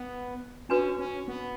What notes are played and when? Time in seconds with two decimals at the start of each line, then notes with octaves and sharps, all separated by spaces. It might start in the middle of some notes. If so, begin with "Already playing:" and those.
Already playing: B3
0.69 C#4 D4 F#4 B4
0.99 C#4
1.28 B3